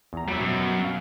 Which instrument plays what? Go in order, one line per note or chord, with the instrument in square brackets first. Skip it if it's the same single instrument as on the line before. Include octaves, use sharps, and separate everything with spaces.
[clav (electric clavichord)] E2 A#5
[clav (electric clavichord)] F#3 [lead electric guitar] G3 E5
[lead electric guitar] F#2 [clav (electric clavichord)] B2
[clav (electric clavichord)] F5